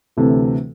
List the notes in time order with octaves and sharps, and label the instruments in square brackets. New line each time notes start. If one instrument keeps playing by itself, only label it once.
[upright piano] D2 C3 E3 A3